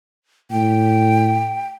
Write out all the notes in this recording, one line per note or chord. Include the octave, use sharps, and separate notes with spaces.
A2 G5